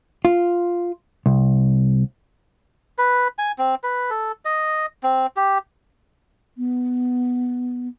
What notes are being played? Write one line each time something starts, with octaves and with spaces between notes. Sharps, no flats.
F4
C2
B4
G#5
C4
B4
A4
D#5
C4
G4
B3